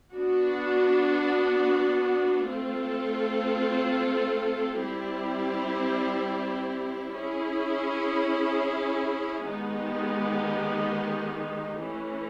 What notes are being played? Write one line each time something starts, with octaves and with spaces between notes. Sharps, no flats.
B3 D4 F#4
A3 C4 F4 A4
G3 C4 E4 G4
C#4 E4 G#4
D#3 G#3 B3 D#4 G4
E3 A3 C#4